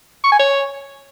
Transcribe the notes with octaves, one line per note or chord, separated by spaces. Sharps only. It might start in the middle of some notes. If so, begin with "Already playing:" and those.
C#6
G#5
C#5